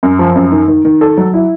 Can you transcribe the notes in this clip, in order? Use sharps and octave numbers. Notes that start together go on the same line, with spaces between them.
F#2
F3
F#2
D#3
D#3
D#3
A4
F#3
E4